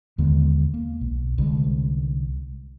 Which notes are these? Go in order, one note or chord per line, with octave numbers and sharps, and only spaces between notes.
D#2 D3 G#3 B3
A#3
B1
C2 D3 G3 G#3